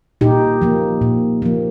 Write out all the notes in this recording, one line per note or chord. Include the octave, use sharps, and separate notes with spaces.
A#2 D#4 G4
F3 A#3
A#2
F3 A#3